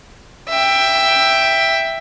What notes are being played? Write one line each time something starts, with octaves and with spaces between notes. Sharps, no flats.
E5 G5